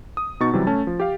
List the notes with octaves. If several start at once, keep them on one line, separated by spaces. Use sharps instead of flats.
D#6
B2 B3 D#4 C#6 A6
C3 E3 F#3 G3
A3 C#4 A5
F3
G4 F5